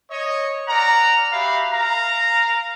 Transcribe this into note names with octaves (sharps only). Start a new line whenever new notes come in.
C#5 D#5
A#4 D5 F#5 A#5
F#4 G4 E5 F5 B5
A#4 F5 A#5